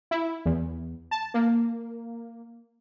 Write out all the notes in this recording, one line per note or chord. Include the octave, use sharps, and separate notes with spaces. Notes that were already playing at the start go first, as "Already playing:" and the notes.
E4
E2
A5
A#3